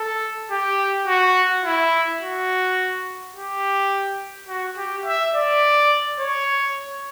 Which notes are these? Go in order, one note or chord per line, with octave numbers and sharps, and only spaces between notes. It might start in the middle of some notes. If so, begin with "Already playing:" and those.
Already playing: A4
G4
F#4
E4
F#4
G4
F#4
G4
E5
D5
C#5